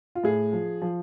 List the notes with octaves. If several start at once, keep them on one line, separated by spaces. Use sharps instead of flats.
F4
A2 G#4
F3
F3